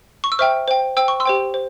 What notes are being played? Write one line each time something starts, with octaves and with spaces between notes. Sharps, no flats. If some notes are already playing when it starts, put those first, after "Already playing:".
C#6
E6
C5 E5 G5 C#6 F6
C5 G5
C5 G5 E6
C#6
C6 E6
G4 C5 G5
C5